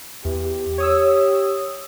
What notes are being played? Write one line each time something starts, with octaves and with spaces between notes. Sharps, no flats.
E2 G4
C#5 D#6 E6